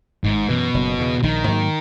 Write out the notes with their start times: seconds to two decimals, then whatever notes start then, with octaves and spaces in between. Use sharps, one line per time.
0.24 G#1 G#2
0.48 F#2 B2 E3
0.74 F#1
0.98 E2 C#3
1.23 A#1 D#3
1.48 G#2 F#3 A#3